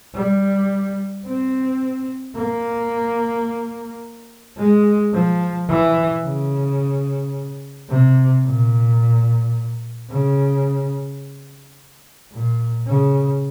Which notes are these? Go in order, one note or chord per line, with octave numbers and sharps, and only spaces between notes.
G3
C4
A#3
G#3
F3
E3
C#3
C3
A#2
C#3
A#2
C#3